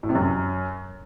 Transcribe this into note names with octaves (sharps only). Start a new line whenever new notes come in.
A2
C3
F#2